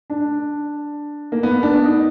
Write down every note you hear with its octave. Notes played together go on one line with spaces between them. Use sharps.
D4
A#3
B3
D4
D#4